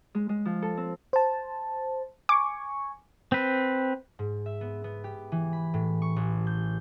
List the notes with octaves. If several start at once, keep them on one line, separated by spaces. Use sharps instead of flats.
G#3
G#3
F3
A4
C4
C5 A5
G#5 C#6 D6
C4 B4
G#2
E5
B3
B3
G4
E3
B5
A2
C#6
A1
G6